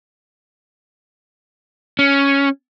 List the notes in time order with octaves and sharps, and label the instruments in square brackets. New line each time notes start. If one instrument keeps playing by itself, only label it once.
[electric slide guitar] C#4